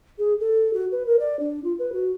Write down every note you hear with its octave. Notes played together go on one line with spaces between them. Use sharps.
G#4
A4
F#4
B4
A#4
D5
D4
F4
B4
F#4